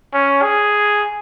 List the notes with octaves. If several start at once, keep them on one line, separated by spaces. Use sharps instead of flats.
C#4
G#4